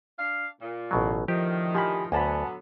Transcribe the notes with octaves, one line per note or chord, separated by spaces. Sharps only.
D4 F5
A#2
A1 B2 F#3
A2 D3 D#3 F3 G4
F3 G4 G#5 B5
D2 D3 F#3 B3 G#5 A5 B5